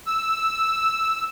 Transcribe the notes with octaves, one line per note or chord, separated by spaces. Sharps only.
E6